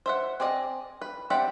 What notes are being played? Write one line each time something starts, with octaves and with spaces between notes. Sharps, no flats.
C5 E5 F#5
C4 G#4 D5 D#5
B4
C4 G4 D5 E5 F#5